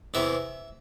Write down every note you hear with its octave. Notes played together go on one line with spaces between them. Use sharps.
E2 C3 E3 E5